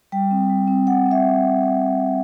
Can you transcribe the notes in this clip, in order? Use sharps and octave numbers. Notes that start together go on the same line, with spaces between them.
G3 G5
C4
G3
C4
G3 F#5
C4
E5